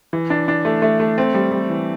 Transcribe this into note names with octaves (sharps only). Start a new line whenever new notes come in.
E3
D4
D4
A3
A3
A3
C4
G3
G3
E3